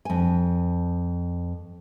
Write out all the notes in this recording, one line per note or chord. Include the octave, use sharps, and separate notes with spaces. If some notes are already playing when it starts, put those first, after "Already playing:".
F2 G#5